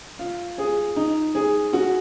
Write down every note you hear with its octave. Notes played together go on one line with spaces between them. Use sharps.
F4
G#4
D#4
G#4
F#4